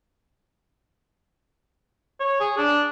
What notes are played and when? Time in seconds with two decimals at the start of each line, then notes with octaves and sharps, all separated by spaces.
2.20 C#5
2.41 G#4
2.58 D4